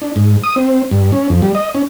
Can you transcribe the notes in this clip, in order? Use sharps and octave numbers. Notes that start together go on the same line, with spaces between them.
D4
G#2
D#6
C4
G2
C#4
F2
G3
D#5
C#4